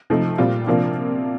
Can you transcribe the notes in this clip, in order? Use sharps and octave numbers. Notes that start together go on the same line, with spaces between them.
C3 F3 A3 D#4
A#2 G3 C4 F4
C3 F3 A#3 D4 F4